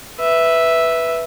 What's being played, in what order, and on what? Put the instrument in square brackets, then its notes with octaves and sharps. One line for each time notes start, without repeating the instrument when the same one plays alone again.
[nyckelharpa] B4 E5